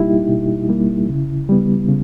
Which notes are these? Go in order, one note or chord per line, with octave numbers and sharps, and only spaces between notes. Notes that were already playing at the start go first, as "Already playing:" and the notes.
Already playing: B2 G3 A#3 D#4 E4 G4
B2
G3 A#3
C#3
G3 B3
C#3